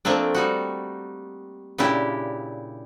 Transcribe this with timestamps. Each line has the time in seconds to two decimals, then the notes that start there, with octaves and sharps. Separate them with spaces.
0.05 F3 A3 A#3 C4 D4
0.35 G3 D#4 F#4
1.78 A#2 C#3 D4 E4 G4